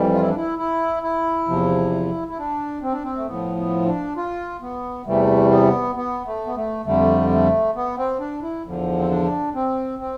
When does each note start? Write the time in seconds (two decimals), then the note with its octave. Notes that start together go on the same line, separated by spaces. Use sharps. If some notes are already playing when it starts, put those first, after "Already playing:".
Already playing: F2 E3 G3
0.14 F4
0.21 E4
0.28 D4
0.36 E4
0.59 E4
1.03 E4
1.48 E2 C3 F3
2.29 E4
2.38 D4
2.82 C4
2.92 D4
3.03 C4
3.16 A3
3.26 A2 F3 B3
3.57 B3
3.82 C4
3.87 D4
4.16 F4
4.62 B3
5.06 E2 C3 E3 G3 A3
5.51 B3
5.96 B3
6.26 A3
6.46 B3
6.55 A3
6.85 F2 D3 G3 A3
7.30 A3
7.75 B3
7.97 C4
8.20 D4
8.42 E4
8.65 E2 D3 F3
8.99 C4
9.09 D4
9.55 C4
9.99 C4